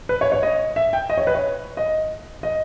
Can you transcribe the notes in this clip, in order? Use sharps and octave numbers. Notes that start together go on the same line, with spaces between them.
B4
C#5
C#5
D#5
E5
G5
D#5
C#5
B4
C#5
D#5
D#5